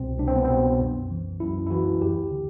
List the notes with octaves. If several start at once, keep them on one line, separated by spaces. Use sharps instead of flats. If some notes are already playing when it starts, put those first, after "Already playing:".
Already playing: C2 B2 C4
C2 D4
C4
B3
B2 C4
F#2
E3
F#2 E4
E4
E3 F#4
D2 G4
D3